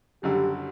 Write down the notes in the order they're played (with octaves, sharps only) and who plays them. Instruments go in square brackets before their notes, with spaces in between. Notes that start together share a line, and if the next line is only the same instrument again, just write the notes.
[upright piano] F#1 F#2 D3 G3 [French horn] G4